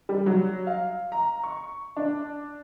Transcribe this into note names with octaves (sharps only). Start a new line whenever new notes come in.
G3
F#3
F5
A#5
C#6
D4